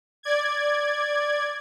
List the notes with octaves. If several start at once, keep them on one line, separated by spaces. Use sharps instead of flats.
D5 G#6